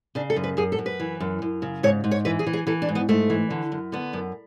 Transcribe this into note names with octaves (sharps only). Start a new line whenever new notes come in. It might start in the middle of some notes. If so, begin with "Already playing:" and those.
C#3 D4
A4
F#2
B4
F#2 G#4
A4
F#2
B4
E3
F#2
F#2
C#3
G#2 C#5
G#2
C#5
E3 B4
G#4
E3
G#4
E3 A4
D4
G#2
B3
G#2 A3
E3
D3
F#2
D3 B3
F#2